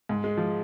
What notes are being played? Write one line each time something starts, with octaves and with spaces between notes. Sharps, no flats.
G#2
G#3
F3